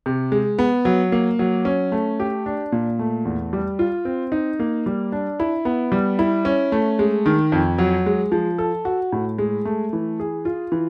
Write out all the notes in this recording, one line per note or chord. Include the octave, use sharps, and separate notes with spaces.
C3
G#3
B3
F#3
A#3
F#3
C#4
A3
G4
D4
A#2
A3
E2
G3
F4
C4
D#4
A#3
G3
D4
E4
B3
G3
E4
C#4
A3
G#3
D#3
F2
F#3
G#3
F3
A4
F#4
A2
G#3
A3
E3
G#4
F4
E3